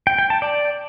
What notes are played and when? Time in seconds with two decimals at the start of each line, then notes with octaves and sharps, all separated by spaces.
0.07 G5
0.19 G5
0.30 A5
0.42 D5